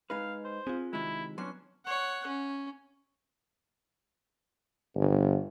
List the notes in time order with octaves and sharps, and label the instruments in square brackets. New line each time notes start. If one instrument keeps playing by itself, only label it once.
[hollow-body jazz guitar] G#3 D#4 B4 [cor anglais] F5
[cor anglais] C5
[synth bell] C4 F4 [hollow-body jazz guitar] G#4
[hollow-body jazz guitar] C3 D#3 G#3 [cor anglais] E4
[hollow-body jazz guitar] F#3 B3 D4 [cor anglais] C#4 [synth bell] C6
[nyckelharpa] C#5 F#5
C#4
[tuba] G1